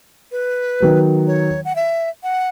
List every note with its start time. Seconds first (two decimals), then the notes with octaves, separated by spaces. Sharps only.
0.32 B4
0.80 D#3 F#3 B3
1.27 C#5
1.65 F#5
1.76 E5
2.23 F#5